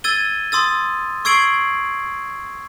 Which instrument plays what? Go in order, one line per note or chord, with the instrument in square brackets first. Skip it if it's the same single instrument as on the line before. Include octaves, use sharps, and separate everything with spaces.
[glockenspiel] E6 G#6 A6 D#7 G7
C6 D#6 E6 A6
C#6 E6 G#6 C7 D7 F#7